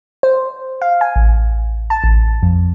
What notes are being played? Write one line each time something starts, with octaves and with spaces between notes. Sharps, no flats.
C5
F5
G#5
A1
A5
A1
F2